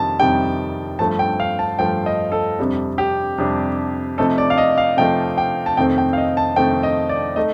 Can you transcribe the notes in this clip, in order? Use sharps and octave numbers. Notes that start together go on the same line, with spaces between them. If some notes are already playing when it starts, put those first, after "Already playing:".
Already playing: F2 C3 D#3 G3 A5
F2 C3 D#3 G3 G5
G2 F3 A3 A5
G5
F5
A5
G2 F3 A3 G5
D#5
A4
F2 C3 G3 D4
G4
F2 C3 G3 D4
C3 F3 A3 D#4 A4
D5
F5
D#5
F5
C3 F3 A3 D#4 G5
G5
A5
F2 C3 D#3 A3 C4 G5
G5
F5
D#5
A5
F2 C3 D#3 A3 C4 G5
D#5
D5
A3 D#4 D#5